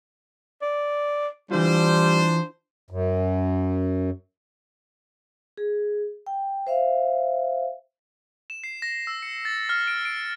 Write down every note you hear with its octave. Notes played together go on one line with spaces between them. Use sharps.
D5
E3 G3 D4 E4 F4 C5
F#2
G#4
G5
C5 E5 F5
E7
C7
A#6
E6
C#7
A6
F6
D7
D7